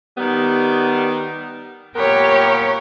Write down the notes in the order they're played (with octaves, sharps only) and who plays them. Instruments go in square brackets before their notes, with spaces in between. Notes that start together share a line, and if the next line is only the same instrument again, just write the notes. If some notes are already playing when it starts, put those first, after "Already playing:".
[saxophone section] D#3 G3 B3
[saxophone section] A#2 B3 A#4 [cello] G4 C#5